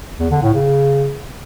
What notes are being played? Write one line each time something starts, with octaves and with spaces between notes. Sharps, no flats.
E2
D3
A2
C#3